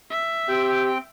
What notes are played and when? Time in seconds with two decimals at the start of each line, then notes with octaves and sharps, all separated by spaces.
0.10 E5
0.49 C4 G4 G5